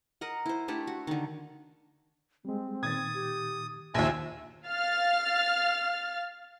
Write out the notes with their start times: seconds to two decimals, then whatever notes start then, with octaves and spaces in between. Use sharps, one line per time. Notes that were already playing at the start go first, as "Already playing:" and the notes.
0.21 A#4 D#5 F#5
0.46 E4 C5
0.68 A3 D4 E4 G4
0.87 F#4
1.07 D3 D#3
2.45 G3 G#3 C4
2.83 A#2 D#3 D#6 G#6 A6
3.14 G4
3.94 A#1 D#2 F4 E5 G#5 E6
4.67 F5 F6 A6